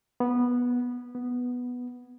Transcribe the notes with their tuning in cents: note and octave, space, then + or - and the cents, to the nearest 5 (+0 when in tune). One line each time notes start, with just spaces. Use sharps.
B3 -10
B3 +0